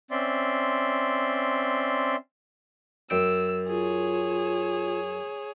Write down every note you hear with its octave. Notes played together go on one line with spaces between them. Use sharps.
C4 C#4 D5 E5 C6
F#2 G5 E6
F4 G#4 C#5